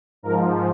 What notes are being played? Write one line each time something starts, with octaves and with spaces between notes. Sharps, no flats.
G#2 F3 A#4